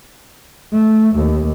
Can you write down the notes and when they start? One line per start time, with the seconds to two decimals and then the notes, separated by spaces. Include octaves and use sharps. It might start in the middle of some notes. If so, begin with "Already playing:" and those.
0.73 A3
1.16 D#2